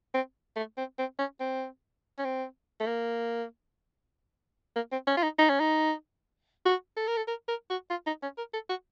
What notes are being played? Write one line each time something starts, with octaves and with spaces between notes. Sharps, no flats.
C4
A3
C4
C4
C#4
C4
C#4
C4
A3
A#3
A#3
C4
C#4
F4
D#4
D#4
C#4
D#4
F#4
A4
A#4
A4
A#4
A#4
F#4
F4
D#4
C#4
A#4
A4
F#4